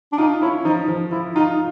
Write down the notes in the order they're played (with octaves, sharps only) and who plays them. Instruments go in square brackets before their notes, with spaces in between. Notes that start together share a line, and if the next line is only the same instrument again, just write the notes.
[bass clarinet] D4
[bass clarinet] D#4 [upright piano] F4
[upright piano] C#4 [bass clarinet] E4
[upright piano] F3 [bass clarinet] D#4
[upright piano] F3
[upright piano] F3 [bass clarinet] E4
[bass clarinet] D#4 [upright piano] F4